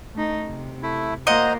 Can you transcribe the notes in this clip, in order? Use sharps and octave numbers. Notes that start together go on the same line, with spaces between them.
A3 D#4
C3
A3 E4
A#3 F4 C5 D#5 F#5 A#5